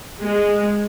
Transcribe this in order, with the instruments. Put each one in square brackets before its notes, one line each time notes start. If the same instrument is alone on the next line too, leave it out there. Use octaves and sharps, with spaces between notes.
[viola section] G#3